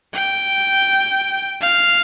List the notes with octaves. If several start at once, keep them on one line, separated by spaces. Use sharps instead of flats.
G5
F5